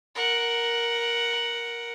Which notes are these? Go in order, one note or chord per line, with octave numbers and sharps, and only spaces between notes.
A#4 F#5